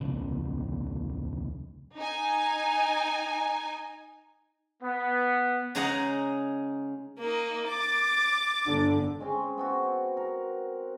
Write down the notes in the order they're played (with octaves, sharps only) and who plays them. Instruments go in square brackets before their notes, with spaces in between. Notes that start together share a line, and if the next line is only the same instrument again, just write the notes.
[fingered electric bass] D#1 C2 C#3
[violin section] D#4 G#5
[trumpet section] B3
[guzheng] C#3 G#3 D#4 G#4 F#5 A#5
[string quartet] A#3 D#4
D6 A6
[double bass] G1 D3
[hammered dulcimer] G#3 C4 C#4 C6
B3 C4 F#4
A#4